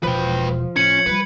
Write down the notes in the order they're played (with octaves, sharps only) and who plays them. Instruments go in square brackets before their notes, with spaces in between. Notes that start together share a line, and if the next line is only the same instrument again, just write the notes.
[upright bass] E1 B2 [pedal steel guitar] F3 [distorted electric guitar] B4 G5
[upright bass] A2 [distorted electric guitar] C#4 [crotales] G#6 C#7 F#7
[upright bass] G3 G#3 [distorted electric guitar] B4